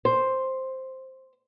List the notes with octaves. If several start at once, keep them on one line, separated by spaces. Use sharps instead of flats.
C5